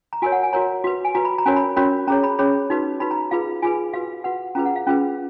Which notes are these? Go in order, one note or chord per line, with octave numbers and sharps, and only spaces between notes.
A#5
F#4 A#4 C#5 G#5
F#5
G#5
F#4 A#4 C#5 A#5
F#4 B4
G#5
F#4 B4 A#5
B5
A#5
C#4 F#4 A#4 C#5 G#5
B5
C#4 F#4 A#4 C#5 B5
C#4 G#4 C#5 A#5
B5
C#4 G#4 C#5 B5
D#4 F#4 B4
D#4 F#4 B4 B5
A#5
F4 G#4 B4 F5
F4 G#4 B4 G#5
F#4 B4 F5
F#4 B4 F#5
C#4 F4 G#4 B4 A#5
F#5
F5
C#4 F4 G#4 B4